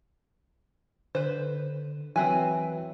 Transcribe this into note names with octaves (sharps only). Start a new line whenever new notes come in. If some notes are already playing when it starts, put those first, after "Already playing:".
D3 B4 C5
E3 F#3 C4 B4 E5 G#5